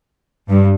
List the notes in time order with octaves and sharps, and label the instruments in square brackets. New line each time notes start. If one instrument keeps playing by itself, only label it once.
[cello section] G2